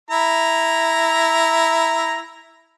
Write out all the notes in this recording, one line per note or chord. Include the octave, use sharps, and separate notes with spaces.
E4 A#5